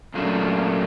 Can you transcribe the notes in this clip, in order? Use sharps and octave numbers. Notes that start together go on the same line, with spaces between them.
A#2 F#3 A3 A#3 C#4 D4